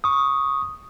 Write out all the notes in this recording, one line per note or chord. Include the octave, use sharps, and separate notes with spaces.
C#6 D#6